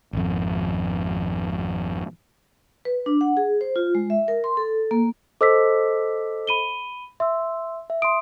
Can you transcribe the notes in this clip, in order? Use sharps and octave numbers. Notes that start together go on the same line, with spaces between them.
G#1 F2
B4
D4
F#5
G#4
C5
F4
G#3
E5
A#4
C6
A4
A#3
A4 C5 D#5 D6 E6 B6
B5 D#7 G7
E5 C6 E6
E5
C6 D#6 D7